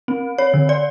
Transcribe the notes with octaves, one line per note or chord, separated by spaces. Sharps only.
C4
C#5
D3
D5